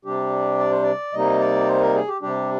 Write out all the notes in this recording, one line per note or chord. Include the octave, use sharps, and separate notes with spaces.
C3 G3 D4 G4
D5
C5
D5
C3 G3 A#3 D#4 D#5
D5
C5
A#4
G#4
G4
C3 G3 D4 G4